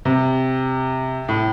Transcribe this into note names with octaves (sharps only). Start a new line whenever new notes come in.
C3
A2